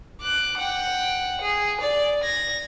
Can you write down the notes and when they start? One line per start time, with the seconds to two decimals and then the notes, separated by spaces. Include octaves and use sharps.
0.21 D6 F#6
0.58 F#5 G5
1.41 G#4
1.81 D5
2.23 G#6 A#6